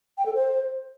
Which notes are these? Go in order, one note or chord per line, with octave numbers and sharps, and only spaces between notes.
G5
A4
C5